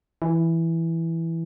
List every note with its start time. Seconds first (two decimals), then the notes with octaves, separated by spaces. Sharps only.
0.22 E3